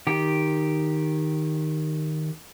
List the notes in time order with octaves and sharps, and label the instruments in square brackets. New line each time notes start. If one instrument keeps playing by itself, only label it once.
[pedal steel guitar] D#3 G4